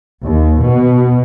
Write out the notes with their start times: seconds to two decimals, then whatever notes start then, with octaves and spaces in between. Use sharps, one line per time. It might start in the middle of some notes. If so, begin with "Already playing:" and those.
0.24 D#2
0.62 B2